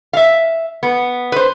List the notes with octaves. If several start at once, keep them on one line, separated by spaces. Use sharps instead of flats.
E5 F5
B3
B4 C5